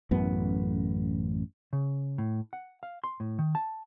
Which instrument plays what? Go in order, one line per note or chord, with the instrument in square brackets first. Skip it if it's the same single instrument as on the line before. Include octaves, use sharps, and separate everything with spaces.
[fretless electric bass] A1 F#2 B3
[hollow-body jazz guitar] C#3
A2
F#5
F5
C6
A2
D#3
A5